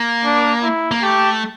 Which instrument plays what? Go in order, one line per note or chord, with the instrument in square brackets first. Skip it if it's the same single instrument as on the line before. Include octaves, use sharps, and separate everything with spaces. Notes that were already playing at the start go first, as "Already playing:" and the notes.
Already playing: [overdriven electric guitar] A#3
[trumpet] D4
E4
[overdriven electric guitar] A#3
[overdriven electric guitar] A3 [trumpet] G4